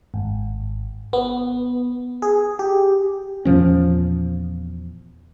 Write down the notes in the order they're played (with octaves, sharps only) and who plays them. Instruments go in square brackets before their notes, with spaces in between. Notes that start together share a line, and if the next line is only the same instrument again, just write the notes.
[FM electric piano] G#1
B3
G#4
G4
[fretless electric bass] E2 A#2 F3 C#4